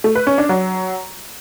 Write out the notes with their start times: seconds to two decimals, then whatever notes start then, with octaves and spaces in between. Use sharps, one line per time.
0.04 A3
0.15 B4
0.27 C#4
0.38 D4
0.49 F#3